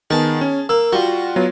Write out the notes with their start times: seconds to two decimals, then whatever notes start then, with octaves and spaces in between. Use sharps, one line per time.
0.10 D#3 B3 G#4 A5
0.41 C#4
0.69 A#3 E6
0.93 G3 F4 F#4
1.36 F#3 B3 F4